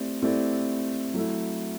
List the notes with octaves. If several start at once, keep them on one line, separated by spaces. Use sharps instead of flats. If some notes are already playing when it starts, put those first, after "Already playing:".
Already playing: A3 C4 E4 G4 D5
A3 C4 E4 G4 D5
F#3 A3 E4